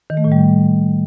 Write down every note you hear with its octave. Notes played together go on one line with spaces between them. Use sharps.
D#3
A3
A2
G3